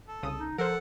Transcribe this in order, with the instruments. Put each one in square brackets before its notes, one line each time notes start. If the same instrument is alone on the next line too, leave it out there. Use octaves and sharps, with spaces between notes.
[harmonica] A4
[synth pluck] C2 C#3 D#6
[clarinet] D#4
[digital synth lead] F3 [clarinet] A4 [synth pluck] A#4 C5 [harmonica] F#5